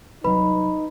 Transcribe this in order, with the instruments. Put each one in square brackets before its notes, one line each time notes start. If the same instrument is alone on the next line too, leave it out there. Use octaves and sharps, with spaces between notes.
[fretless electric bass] C2 F#3 [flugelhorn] D#4 [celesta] B4 B5